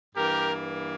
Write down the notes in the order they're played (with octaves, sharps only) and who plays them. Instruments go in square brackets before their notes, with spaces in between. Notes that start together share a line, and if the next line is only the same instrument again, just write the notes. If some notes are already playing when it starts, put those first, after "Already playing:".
[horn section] G2 E3 A#3 G4 A#4